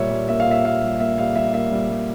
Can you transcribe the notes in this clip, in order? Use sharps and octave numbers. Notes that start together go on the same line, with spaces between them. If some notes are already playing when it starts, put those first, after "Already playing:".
Already playing: A#2 G3 A#3 C#5 E5
G3
A#3 E5
F5
A#2
E5
A#3 F5
G3
A#3 E5
G3 F5
G3 E5
A#3 E5
G3
G3